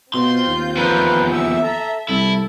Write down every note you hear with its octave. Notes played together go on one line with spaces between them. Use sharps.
B2 C4 F4 C6 G6
D#2
E2 F3 A#4 B4
E5 E6
A4 A#5
C2 E4 A4